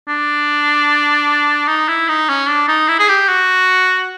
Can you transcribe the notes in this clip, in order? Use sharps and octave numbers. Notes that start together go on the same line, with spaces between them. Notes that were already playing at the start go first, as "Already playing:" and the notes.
D4
D#4
E4
D#4
C#4
D4
D#4
E4
G#4
G4
F#4